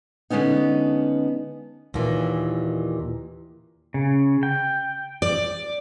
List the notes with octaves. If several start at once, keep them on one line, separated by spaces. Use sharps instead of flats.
D3 G#3 B3 C#4 D#4
D#2 A#2 E3
C#3
G5
D5